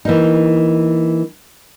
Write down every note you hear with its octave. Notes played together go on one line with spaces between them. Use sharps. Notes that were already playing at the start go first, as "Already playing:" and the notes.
E3 A#3 D#4